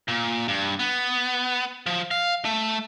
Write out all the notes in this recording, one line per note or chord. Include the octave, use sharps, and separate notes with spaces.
A#2
G2
B3
F3
F5
A3